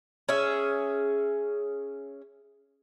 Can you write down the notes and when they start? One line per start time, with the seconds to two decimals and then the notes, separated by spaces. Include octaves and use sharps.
0.29 C#4 G#4 E5